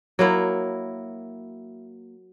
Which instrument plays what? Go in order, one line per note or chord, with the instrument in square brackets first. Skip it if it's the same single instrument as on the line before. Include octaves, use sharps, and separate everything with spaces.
[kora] F#3 A#3 E4